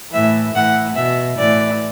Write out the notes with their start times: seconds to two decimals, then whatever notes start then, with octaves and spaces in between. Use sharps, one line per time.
0.13 A2 E3 E5
0.54 A2 E3 F#5
0.95 B2 E5
1.38 A2 E3 D5